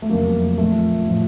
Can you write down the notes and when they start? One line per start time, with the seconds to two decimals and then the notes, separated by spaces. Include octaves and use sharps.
0.02 A3
0.09 F2 C#3 F#3 A#3
0.58 A#2 F3 A3
1.06 A2 F3